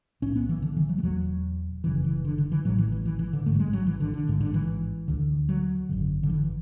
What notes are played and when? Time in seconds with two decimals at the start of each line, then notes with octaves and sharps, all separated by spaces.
0.22 B1 A2 C#4
0.36 B3
0.49 E3
0.62 D3
0.77 E3
0.89 F#3
0.98 G#3
1.03 E1 E2 B2 F#3
1.84 F#1 F#2 C#3 E3
2.05 E3
2.25 D3
2.38 D3
2.52 E3
2.65 A1 A2 F#3
2.78 E3
2.92 E3
3.06 E3
3.19 E3
3.33 D3
3.46 A1 G#2 A3
3.54 F#3
3.60 G#3
3.73 F#3
3.87 E3
4.00 D3
4.14 D3
4.28 A1 G#2
4.41 D3
4.54 E3
5.08 D2 D3
5.49 F#3
5.89 G#1 F#2 D3
6.23 D3
6.29 E3